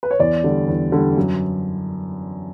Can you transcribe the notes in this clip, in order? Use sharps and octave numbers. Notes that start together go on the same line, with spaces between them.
B4
C#5
E2 D5
D3 G3
E2
D3 G3
F#2